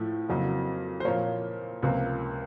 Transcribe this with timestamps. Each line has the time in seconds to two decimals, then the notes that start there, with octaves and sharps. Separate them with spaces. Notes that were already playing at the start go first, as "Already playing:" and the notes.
Already playing: A2 F3 A3
0.29 F2 C#3 F#3 A#3
1.00 C5
1.05 A#2 F3 A#3 C#5
1.83 C#2 C3 F3 A#3